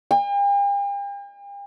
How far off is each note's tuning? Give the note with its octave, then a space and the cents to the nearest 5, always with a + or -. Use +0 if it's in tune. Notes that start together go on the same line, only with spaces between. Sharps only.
G5 +45